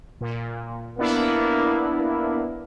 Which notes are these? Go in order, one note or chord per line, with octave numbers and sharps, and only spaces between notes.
A#2
A#3 B3 D4 E4
A#3